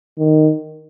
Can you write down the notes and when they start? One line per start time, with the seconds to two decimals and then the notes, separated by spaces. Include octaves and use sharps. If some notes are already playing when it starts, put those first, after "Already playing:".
0.18 D#3